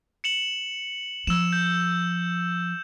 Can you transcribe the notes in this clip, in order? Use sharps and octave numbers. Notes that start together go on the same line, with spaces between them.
C#7 E7 F#7
F3 E6 E7
G6